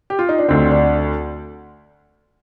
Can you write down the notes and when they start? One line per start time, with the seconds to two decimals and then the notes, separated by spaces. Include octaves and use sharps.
0.10 G4
0.19 F4
0.29 D#4
0.38 D4
0.48 D2 D3 C4
0.71 D4